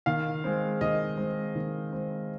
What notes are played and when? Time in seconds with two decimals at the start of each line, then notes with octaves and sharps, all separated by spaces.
0.06 D#3 F5
0.44 G#3 C4
0.81 D#3 D#5
1.17 G#3 C4
1.55 D#3
1.93 G#3 C4